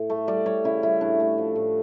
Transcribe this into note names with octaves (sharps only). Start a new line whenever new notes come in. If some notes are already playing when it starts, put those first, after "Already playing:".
Already playing: A2
A3
G3 D5
G3 C#5
C#3 E4
G3 E4
A2 D4
A3
F3
A2